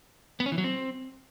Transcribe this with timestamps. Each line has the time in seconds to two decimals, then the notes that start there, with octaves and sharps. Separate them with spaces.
0.40 B3
0.46 C#4
0.52 E3
0.58 F#3
0.64 C4